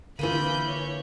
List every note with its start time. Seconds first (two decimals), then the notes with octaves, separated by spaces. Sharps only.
0.19 D3 E3 A#3 D4 F4 B5 G6 D#7
0.67 C#5